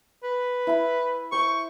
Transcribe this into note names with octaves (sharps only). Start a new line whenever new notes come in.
B4
E4 E5 B5
C5 C6 C#6